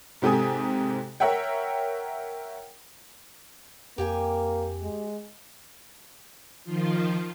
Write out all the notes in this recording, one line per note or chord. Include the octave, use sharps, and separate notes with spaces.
G#2 C3 G4 A4 G#5 D#6
A#4 C#5 E5 F#5 G5
F2 A#3 G4 G5 G#5
G#3
D#3 F3 F4